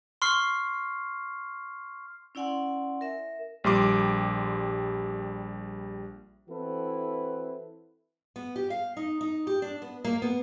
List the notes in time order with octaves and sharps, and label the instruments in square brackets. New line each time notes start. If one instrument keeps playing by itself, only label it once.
[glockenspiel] C6 C#6 F6 C7
[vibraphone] C#4 E4 D5 F#5 G#5 C6
A#4 E5
[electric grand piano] A#1 G3 C6 D6
[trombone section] E3 C4 E4 F#4 A4 B4
[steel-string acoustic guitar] B3
G4
F5
D#4
D#4
G4
D4
B3
A#3
B3